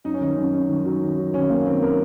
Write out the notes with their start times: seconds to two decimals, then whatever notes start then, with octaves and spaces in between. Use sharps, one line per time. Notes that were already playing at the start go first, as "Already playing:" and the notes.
0.04 F#2 D#4
0.14 C#4
0.21 D#3 D#4
0.36 F#2
0.53 F#2
0.69 D#3
0.86 F#3
1.02 D#3
1.18 F#3
1.34 D#3 C#4
1.50 F#2 A#3
1.66 D#3 C4
1.83 A#4